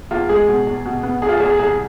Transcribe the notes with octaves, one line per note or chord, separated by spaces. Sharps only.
E2 F4
G#3 G#4
B2
E2
B2
B3
E2 G#4
F4
G#4
E2
G#4
C2 G#4